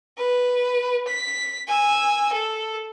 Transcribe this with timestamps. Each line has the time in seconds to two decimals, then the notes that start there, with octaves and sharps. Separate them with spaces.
0.18 B4
1.07 B6
1.68 G#5 E6
2.33 A4